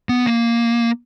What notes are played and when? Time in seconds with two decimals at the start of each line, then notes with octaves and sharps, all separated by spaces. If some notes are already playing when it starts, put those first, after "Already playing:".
0.09 B3
0.27 A#3